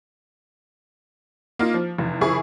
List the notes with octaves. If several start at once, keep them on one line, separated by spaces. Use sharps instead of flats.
A#3 D#4 F4
F3
F1 E2
F#1 F3 E4 G#4 C#6